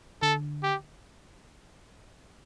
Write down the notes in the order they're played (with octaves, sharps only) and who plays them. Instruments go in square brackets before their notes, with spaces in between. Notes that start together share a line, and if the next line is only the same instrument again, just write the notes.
[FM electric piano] D3 [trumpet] A4
[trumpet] G4